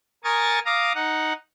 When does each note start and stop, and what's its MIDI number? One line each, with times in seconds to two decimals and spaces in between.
0.24 0.59 70
0.24 0.59 80
0.24 0.59 85
0.24 0.59 87
0.24 0.59 93
0.66 0.93 77
0.66 0.93 82
0.66 0.93 86
0.66 0.93 87
0.95 1.33 63
0.95 1.33 78